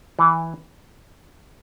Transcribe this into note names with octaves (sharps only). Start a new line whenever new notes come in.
E3